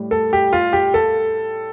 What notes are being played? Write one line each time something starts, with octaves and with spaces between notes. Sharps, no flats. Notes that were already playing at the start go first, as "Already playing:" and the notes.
Already playing: A2 G3
A4
G4
F4
G4
A4